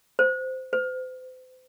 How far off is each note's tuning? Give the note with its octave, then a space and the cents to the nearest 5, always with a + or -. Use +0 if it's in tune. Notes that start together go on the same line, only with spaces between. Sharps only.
C5 -15
C5 -40